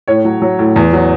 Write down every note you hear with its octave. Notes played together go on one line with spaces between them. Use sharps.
A2 C#5
F#3
F#3
A2
E2
F#3